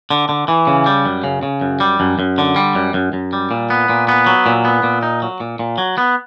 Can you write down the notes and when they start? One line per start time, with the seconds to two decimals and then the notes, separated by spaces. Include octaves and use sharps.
0.11 D3
0.29 D3
0.48 E3
0.67 C#3
0.86 G3
1.06 F#2
1.24 C#3
1.43 C#3
1.61 F#2
1.80 G3
2.00 F#2
2.19 F#2
2.38 D3
2.56 G3
2.75 F#2
2.94 F#2
3.13 F#2
3.33 G3
3.51 A#2
3.70 B3
3.89 A#2
4.08 B3
4.26 F#3
4.46 A#2
4.65 B3
4.83 A#2
5.03 D#4
5.22 F#3
5.40 A#2
5.59 A#2
5.78 F#3
5.98 B3